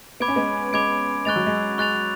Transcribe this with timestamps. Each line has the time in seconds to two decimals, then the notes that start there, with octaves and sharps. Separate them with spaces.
0.20 B3 B5 D6 G#6 D7
0.28 C#4
0.36 G#3 B3
0.73 G#3 B5 D6 G#6 D7
1.25 G#3 C#6 F#6 A6 F7
1.36 F#3
1.47 G#3
1.78 G#3 C#6 F#6 A6 F7